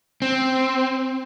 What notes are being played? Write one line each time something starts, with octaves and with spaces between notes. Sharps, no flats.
C4